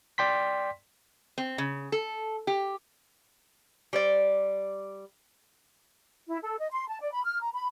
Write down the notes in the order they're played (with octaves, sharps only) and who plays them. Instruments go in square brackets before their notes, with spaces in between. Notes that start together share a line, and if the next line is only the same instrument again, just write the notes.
[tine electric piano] D5 G5 C6 B6
[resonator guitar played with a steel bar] C4
C#3
A4
G4
G3 C5 D5
[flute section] E4
A4
D#5
C6
A5
D5
B5
F6
A#5
B5